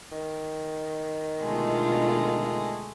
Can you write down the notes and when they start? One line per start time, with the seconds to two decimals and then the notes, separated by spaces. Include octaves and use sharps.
0.12 D#3
1.42 B2 D3 G#3 A3 F4